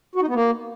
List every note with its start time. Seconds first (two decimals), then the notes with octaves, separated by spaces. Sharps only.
0.15 F#4
0.22 D#4
0.28 B3
0.34 A#3